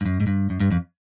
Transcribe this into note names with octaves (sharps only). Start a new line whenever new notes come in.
G2
F#2
G#2
G2
F#2
G2
F2